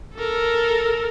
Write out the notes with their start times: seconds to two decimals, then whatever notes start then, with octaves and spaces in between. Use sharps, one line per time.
0.15 A4 A#4